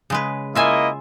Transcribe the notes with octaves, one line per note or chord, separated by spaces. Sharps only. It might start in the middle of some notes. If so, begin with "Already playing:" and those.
C#3 G#3 B4
A#3 E4 F4 D#5 E5 G#5